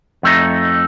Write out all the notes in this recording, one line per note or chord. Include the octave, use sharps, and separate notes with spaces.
F2 A3 D#4